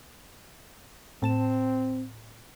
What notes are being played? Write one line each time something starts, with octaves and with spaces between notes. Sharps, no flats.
A2 C4 A5 E7